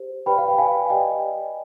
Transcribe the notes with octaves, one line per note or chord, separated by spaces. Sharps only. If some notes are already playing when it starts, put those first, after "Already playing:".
Already playing: G4 C5
G4 B4 D5 G5 B5
F5
G5
F5 G#5
G4 D5 D#5 G5